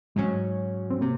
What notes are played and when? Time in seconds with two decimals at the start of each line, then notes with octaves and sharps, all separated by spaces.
0.16 G#2 F#3 G#3 C#4
0.90 C4
1.01 C3 A#3